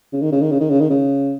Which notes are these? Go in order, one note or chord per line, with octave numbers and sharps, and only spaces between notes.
C#3
D#3
C#3
D#3
C#3
D#3
C#3
D#3
C#3